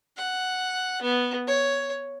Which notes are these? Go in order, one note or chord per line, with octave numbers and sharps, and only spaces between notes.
F#5
B3
C#5